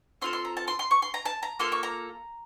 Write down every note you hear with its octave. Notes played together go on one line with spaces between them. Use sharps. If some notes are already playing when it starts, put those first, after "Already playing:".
C4 F4 A4 C6
C6
A#5
A5
C6
C6
C#6
C6
A#5
A5
A#5
A#3 F4 A4 C6
C#6
A#5